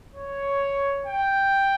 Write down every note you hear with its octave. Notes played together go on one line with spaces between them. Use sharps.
C#5
G5